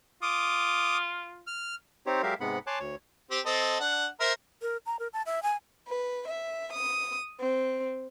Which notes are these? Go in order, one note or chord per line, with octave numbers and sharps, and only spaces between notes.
F4 D6 D#6
F6
C4 D#4 G4 C5 C#5
F#3 G#3 G4 A#4 E5 F5
G#2 C3 G#3 B3 F#5 B5
C#5 G#5 A5 C6 D6 F#6
D2 C#5
C4 G4
C4 A4 D#5
D4 F#5
A#4 C5 E5
A#4
A#5
A#4
A5
E5
G#5
B4
E5
D#6
C4